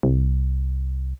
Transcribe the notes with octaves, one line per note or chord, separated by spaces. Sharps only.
C2